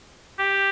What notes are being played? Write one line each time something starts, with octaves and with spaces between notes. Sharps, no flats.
G4